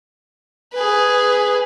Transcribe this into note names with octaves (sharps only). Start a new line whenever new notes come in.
G#4 B4